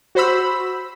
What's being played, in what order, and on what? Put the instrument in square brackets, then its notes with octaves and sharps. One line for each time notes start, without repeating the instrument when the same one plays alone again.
[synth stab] F#4 C5 B5 E6